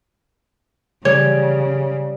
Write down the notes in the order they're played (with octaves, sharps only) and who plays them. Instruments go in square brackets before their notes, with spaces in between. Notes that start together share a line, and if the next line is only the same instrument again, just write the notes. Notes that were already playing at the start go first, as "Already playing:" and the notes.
[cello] C#3 [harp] G3 [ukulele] C#5